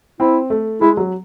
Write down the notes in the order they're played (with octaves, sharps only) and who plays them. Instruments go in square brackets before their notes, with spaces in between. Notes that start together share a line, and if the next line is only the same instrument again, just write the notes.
[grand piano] C4 [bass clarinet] E4
[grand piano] A3
[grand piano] G#3 [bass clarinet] E4
[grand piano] F#3